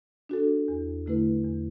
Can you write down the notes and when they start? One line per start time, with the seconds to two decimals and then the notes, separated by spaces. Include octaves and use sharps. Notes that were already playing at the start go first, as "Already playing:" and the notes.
0.29 D4 F#4 A4
0.68 E2
1.06 D3 A3 E4 B4
1.44 E2